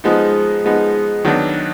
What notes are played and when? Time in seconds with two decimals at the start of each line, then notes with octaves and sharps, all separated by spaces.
0.04 F3 G#3 B3 D#4
0.64 F3 G#3 B3 D#4
1.25 D#3 F#3 B3 D4